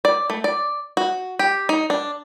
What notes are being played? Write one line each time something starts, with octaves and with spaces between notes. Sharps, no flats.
D5
A3
D5
F#4
G4
D#4
D4